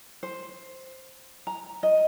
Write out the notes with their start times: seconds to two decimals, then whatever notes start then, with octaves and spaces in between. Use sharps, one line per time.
0.23 C5
1.47 A#5
1.83 D#5